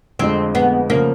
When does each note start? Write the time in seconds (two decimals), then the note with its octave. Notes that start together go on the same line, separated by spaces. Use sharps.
0.19 F2 D3 F3 G#3 C4
0.55 B3
0.90 C#3 F3 A#3